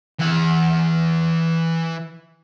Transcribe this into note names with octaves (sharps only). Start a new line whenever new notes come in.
E3 F#5